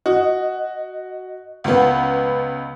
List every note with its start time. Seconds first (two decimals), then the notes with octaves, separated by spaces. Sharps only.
0.06 F#4 D#5
1.64 C#2 B3